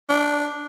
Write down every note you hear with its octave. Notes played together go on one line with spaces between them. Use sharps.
D4